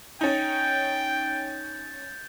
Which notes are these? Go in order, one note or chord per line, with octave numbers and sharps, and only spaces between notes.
C#4 D#4 G5 G6 A6